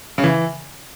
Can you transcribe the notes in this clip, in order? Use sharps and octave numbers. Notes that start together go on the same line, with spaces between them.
C#3
E3